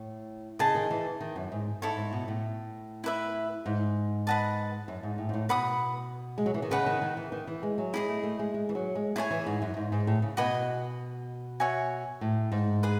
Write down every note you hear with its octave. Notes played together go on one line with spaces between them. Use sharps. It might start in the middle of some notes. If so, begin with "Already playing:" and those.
Already playing: A2
C#3 G#4 D#5 A5
D#3
E3
D#3
F#2
G#2
G#2 E4 A4 C#5
G#2
B2
A2
E4 B4 E5
G#2
B4 D#5 F#5 A5
F#2
G#2
A2
G#2
A2
B2 B4 F#5 B5 D#6
G#3
F#3
E3
D#3
C#3 B4 D#5 F#5
D#3
D#3
E3
D#3
E3
G#3
F#3
G#3 E4 G#4 D#5
A3
A3
G#3
G#3
E3
F#3
G#3
A3 E4 G#4 C#5 G#5
E3
G#2
F#2
G#2
G#2
A2
C#3
B2 F#4 B4 D#5 G#5
F#4 C#5 E5 G#5
A2
G#2
G#4 B4